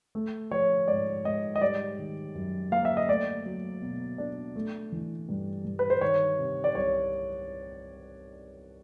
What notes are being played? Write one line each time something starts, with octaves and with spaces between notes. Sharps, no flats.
A3
F3 C#5
G#2 D5
G#2 D#5
D#5
G3 D5
D#3
F#2
A#3 F5
E5
D#5
A3 D5
F#3
B2
D4
A3
E3
G2
G2
B4
C5
D#3 C#5
C3
D5
C2 C#5